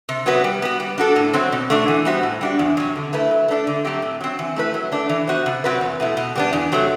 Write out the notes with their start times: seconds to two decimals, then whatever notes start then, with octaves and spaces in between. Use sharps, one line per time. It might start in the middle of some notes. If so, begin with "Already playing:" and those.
0.09 C3
0.26 F#3 B3 F#4 B4
0.44 G3
0.62 B3 F#4
0.80 G3
0.98 D4 F#4 A4
1.16 A2
1.33 F#3 C4 F#4
1.52 B2
1.70 A3 D4 F#4
1.88 E3
2.05 G3 B3 F#4 C5
2.23 A2
2.41 G3 D4 F#4
2.59 E2
2.77 C3 F#3
2.96 D3
3.13 A3 E4 B4
3.31 F#3
3.48 A3 D4 A4
3.67 D3
3.85 F#3 A3 C4 G4
4.02 A2
4.21 F#3 C4
4.39 E3
4.56 A3 E4 B4
4.74 F#3
4.92 A3 D4
5.09 E3
5.27 B3 F#4 C5
5.46 C3
5.64 F#3 C4 F#4 B4
5.81 E2
6.00 B2 A3 E4
6.17 B2
6.35 G3 B3 D4
6.53 E2
6.72 C3 F#3 A3